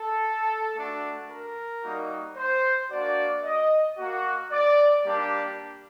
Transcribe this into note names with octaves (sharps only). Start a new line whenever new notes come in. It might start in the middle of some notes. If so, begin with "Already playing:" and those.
Already playing: A4
A3 D4 F#4
A#4
G3 A#3 D#4 F#4
C5
A#3 D4 F#4 D5
D#5
A#3 F#4
D5
G3 A#3 D4 G4